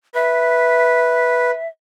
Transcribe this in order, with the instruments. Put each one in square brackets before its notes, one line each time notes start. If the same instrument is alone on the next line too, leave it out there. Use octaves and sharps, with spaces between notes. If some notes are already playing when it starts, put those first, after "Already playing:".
[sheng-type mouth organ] B4 [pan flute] E5